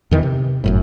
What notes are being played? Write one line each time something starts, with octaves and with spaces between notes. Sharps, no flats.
E2 D#3 E3
C3
G1 F#2 A2